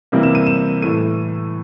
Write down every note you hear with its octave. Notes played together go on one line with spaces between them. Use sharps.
C3 E3 G3 A#3
E7
D#7
E7
A2 E3 A3 D#7